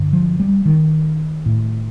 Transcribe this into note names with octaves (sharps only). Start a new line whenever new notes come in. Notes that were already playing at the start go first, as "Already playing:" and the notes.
Already playing: G2 D3
F3
G3
D#3
A2